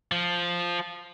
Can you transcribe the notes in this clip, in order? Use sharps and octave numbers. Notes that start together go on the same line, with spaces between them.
F3